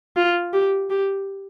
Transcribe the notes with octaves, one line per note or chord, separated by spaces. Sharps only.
F4
G4
G4